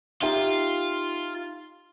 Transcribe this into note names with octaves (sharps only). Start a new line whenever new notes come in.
D#4 F4 G4 E5